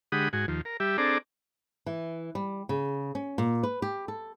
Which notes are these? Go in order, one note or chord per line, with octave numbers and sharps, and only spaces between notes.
D3 G#3 G4 F#5 B5 D#6
G#2 F#4 G#5
D#2 F3
A#4
G3 G4 E5
C4 D4 G#4 A4 D5 A#5
E3
G3
C#3
C#4
A#2
B4
G4
A4